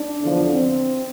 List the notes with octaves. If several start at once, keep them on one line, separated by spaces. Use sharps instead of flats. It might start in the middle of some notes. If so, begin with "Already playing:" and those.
Already playing: D4
E2 D3 F3
C4